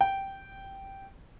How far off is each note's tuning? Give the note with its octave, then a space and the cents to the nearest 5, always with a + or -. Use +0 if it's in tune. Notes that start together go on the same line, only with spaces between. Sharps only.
G5 -10